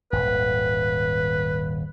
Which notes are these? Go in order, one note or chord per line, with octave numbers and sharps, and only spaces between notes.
D#1 G#1 B4